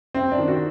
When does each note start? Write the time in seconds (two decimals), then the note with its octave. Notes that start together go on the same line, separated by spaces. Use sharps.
0.14 F#2 C4
0.32 D4
0.39 D#3
0.48 F#4